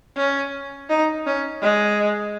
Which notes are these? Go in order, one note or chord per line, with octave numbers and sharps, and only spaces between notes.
C#4
D#4
C#4
G#3